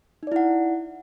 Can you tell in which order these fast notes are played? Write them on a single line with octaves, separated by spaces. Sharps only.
D#4 D5 E4 F#5